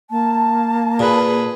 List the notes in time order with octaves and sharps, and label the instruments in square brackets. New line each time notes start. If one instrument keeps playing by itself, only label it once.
[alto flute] A#3 [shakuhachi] A5
[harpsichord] A#2 [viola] G#4 B4